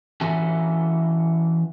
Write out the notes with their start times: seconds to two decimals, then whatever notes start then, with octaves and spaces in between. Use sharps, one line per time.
0.21 E3 C#4 F#4 A4 E5 G#5